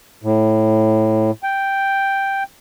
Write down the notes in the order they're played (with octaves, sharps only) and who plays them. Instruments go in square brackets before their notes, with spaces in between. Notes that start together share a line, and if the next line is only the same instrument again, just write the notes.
[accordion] A2
G5